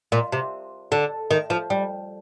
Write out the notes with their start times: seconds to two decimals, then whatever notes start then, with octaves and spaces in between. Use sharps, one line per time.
0.12 A#2
0.32 C3
0.92 D3
1.31 D#3
1.50 F3
1.70 G3